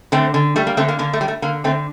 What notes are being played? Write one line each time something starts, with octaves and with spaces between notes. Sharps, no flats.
D3 A3 C4
D3
G3 A3
A#3
D3 A3 C4
A#3
D3 A#3
A3
G3
A3
D3 A#3
D3 A3 C4